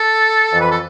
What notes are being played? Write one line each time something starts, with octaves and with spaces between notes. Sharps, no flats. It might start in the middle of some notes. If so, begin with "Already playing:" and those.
Already playing: A4
F2 E3
B4
A4